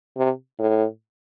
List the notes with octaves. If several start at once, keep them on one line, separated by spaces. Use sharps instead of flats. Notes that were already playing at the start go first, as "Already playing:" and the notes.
C3
A2